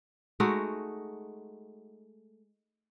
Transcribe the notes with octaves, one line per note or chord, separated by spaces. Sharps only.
G#3 A3 D#4 F#4